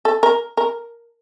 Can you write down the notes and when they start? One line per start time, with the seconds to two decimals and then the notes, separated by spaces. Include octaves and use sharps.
0.05 A4
0.23 A#4
0.57 A#4